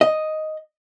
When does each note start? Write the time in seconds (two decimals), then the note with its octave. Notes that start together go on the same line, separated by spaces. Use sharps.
0.01 D#5